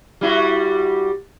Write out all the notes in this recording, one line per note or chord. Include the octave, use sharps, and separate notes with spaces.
G3 E4 F#4